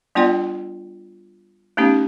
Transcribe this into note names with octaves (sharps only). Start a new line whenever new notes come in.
G3 B3 D4 F4 D5 G5
A3 B3 C#4 D#4 G4